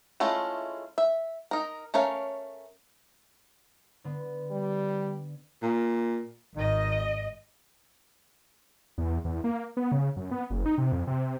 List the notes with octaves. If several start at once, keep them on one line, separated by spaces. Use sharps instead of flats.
G#3 A3 C#4 E4 F4
E5
D#4 A#4
A3 C#4 A#4 C#5 F5
D3 B3
G3
A#2
G#1 D#3 D#5
E2
E2
A#3
B3
C#3
F#2
B3
F#1
D#4
C3
F2
C3